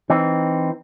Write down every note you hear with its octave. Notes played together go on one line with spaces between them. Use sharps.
E3 C4 D#4